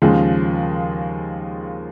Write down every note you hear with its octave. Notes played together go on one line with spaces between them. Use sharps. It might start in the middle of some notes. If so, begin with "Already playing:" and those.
D#2 C#3 F3 G#3